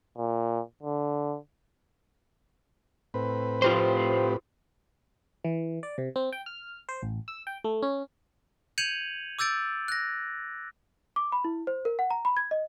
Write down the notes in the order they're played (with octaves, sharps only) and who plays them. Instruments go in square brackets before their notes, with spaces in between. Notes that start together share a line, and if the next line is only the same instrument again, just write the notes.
[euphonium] A#2
D3
[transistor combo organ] A2 C4 B4
[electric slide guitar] F4 G4 C5
[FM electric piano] E3
D5
C3
C4
G5
F6
C5
A1
E6
G5
A3
C#4
[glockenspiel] G6 G#6 C#7 D#7 F7 F#7
D6 E6 G6 A6 D7
F#6 A#6
[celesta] D6
B5
E4
C5
A#4
F#5
A#5
B5
G#6
D#5